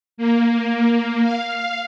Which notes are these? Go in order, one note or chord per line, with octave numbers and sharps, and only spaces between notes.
A#3
F5